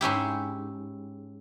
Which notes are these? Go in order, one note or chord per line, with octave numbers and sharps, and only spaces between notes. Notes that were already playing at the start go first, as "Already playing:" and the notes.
G#2 C#4 E4 G4